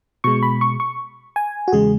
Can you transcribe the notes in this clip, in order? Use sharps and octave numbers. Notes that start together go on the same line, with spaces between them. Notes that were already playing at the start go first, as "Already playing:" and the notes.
B2 G#3 C#6
B5
C#6
C#6
G#5
F#4
E2 C#3 G#3 G#4